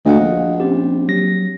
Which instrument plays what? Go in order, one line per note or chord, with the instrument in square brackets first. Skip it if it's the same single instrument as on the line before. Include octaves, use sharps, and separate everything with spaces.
[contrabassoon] D2 [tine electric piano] D#5 F5 F#5
[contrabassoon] A#1
[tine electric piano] C4 C#4 G4
F#3 A#6